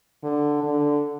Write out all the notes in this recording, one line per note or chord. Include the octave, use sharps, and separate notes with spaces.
D3
D3